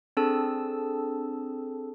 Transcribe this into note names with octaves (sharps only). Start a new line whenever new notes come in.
C4 D4 G#4 A4 A5 E6